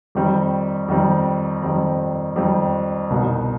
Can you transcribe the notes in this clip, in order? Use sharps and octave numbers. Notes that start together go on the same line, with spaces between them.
F2 D#3 G3 C4
F2 D#3 G3 C4
F2 D#3 G3 C4
F2 D#3 G3 C4
C2 B2 B3 D#4